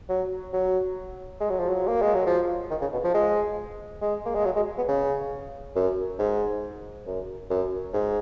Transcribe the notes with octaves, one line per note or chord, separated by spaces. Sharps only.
F#3
F#3
G#3
F#3
F3
F#3
A#3
G#3
F#3
F3
D#3
C#3
B2
F3
G#3
G#3
A#3
G#3
F#3
G#3
B3
C#3
F#2
G#2
F#2
F#2
G#2